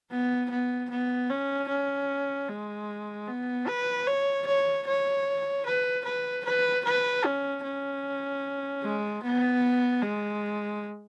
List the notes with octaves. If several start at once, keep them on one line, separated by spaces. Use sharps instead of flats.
B3
B3
B3
C#4
C#4
G#3
B3
B4
C#5
C#5
C#5
B4
B4
B4
B4
C#4
C#4
G#3
B3
G#3